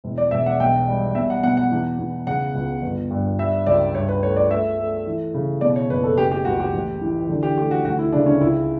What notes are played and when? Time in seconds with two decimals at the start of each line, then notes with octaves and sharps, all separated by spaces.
0.04 E1
0.18 D5
0.31 E1 E5
0.46 F#5
0.60 B1 G5
0.88 G3
1.15 B2 E5
1.30 F#5
1.43 B2 F#5
1.57 F#5
1.72 E2
1.99 E2
2.27 C#3 F#5
2.54 C#2
2.82 G1
3.11 G2
3.38 G3 E5
3.66 C#2 D5
3.94 G2 C#5
4.09 B4
4.22 A3 C#5
4.36 D5
4.50 A3 E5
4.78 A3
5.07 E3
5.34 C#3
5.61 B2 D5
5.76 C#5
5.89 F#1 B4
6.04 A4
6.18 C#3 G4
6.32 G4
6.45 C#2 F#4
6.60 G4
6.73 A1
7.01 E3
7.29 D3
7.43 G4
7.57 A3 G4
7.71 F#4
7.85 D2 F#4
7.99 E4
8.12 C#3 D4
8.26 C#4
8.41 C#2 E4